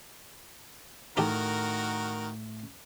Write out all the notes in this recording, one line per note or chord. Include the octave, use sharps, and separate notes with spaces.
A2 D#3 D#4 F#4 G4 A4 A#4